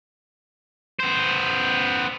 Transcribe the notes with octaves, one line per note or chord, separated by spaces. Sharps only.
B3 C5